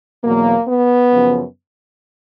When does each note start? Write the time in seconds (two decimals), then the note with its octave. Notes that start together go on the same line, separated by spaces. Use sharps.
0.24 E2 B2 F#3 A#3
0.68 B3
1.12 F#2 C#3 F3